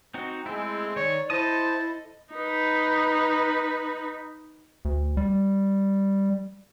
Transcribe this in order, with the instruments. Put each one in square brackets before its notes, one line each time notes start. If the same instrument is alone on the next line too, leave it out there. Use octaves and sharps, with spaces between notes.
[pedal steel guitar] C4 D#4 F#4
[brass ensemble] G#3 [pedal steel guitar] A3 E4 [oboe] C4
[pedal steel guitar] D#3 C#6 [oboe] C#5 [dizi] D5
[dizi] E4 [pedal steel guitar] A4 D#5 D#6 [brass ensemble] C5 [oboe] A5
[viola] D#4 B4
[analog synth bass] D2
G3